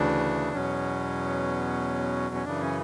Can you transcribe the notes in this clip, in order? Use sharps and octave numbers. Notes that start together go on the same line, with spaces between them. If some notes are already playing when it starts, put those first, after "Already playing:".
Already playing: D2 C#3 E3 D4
E2 B2 F#3 C#4
C#4
F#2 C#3 E3 D4
C#4